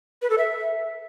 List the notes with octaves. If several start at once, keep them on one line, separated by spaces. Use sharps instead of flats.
B4
A4
E5